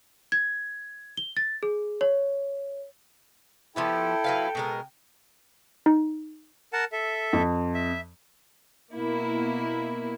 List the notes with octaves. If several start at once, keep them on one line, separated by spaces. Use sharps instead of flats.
G#6
G7
A6
G#4
C#5
F3 B3 E4 G4 A4 G5
F#3 B4 F5
B2 G#3 A#4
D#4
A#4 F#5 A5
A4 E5
F2
E5
B2 A#3 E4